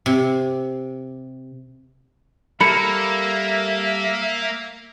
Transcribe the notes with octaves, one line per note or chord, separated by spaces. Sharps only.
C3
G3 A#3 A4 A#4 E5 B5 C#7